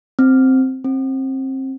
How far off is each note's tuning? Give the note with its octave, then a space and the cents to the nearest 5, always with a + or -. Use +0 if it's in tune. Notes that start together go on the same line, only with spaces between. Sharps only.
C4 +0
C4 +25